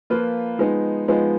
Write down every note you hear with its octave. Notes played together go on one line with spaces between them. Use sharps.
F3 A#3 F4 B4
F3 G#3 B3 D#4
F3 G#3 B3 D#4